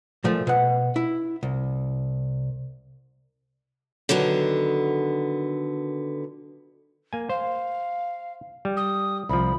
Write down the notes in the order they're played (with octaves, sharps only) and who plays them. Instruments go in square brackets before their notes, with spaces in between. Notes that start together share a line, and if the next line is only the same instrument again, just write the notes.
[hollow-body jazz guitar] A#2 F3 A3
B2 F#5
E4
C2
[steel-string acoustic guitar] D3 D#3 F#3 B3
[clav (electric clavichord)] A#3 G#5
[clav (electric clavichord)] C5 [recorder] F5
[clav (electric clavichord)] G3
[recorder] D#6
[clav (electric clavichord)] C2 F3 [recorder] B5